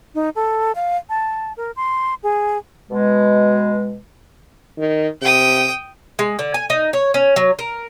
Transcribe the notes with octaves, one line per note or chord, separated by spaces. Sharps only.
D#4
A4
F5
A5
A#4
C6
G#4
B2 G#3
D#3
C3 G5 D#6
G#3
D3
G#5
D#4
C#5
C#4
F#3
A#4